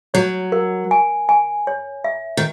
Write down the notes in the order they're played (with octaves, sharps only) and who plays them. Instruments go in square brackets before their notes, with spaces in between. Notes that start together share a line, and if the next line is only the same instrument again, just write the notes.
[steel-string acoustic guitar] F#3 [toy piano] C#5
[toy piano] A#4
G#5
G#5
C#5
E5
[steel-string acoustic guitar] D#3